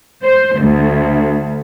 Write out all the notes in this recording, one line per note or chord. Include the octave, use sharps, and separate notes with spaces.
C5
D2